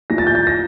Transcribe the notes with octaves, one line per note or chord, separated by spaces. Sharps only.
A2 F3 A#6
A6
G6
A6
A#6